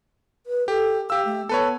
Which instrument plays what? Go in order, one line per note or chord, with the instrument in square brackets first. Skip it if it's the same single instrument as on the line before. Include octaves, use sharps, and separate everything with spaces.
[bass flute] B4
[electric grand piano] G4 [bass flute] A4
[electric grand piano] G4 E6 [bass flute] F5
[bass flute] A3
[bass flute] B3 [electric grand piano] A4 B4 C#5